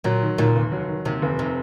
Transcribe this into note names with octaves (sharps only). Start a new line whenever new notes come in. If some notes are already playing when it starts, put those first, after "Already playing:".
A#2 F#3
D#3
D#2 A#2
F1
F#3
D#3
D#2 C3
F1
C3